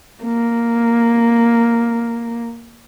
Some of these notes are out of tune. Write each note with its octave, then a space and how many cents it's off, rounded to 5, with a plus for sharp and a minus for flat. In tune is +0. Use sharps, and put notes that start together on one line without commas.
A#3 +0